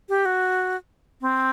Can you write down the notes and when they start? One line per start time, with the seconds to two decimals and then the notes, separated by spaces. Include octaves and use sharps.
0.09 G4
0.25 F#4
1.21 C4